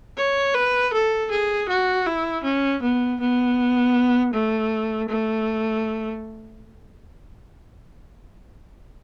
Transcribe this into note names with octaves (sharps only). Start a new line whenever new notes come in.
C#5
B4
A4
G#4
F#4
E4
C#4
B3
B3
A3
A3